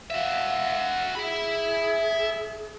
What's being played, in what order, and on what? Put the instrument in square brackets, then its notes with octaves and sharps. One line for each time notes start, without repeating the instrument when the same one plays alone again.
[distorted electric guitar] F#4 E5 [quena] F5
[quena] G#4 [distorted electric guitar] E5 B5